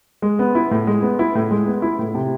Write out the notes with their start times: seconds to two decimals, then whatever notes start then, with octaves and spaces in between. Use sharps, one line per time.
0.22 G#3
0.39 B3
0.55 E4
0.71 A2
0.87 G#3
1.02 B3
1.19 E4
1.35 A2
1.51 G#3
1.67 B3
1.82 E4
1.99 A2
2.15 C3